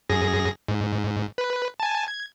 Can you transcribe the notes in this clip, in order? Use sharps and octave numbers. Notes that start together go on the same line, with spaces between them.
F#2 G#4 A#6
G#2
B4
G#5 A5
G#6